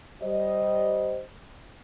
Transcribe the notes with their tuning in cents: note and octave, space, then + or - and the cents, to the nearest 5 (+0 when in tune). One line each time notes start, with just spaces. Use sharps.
G3 -15 C5 -10 D#5 +0